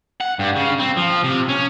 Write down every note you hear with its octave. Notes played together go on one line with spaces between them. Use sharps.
F#5
G2
C#3
C4
F3
C3
C#4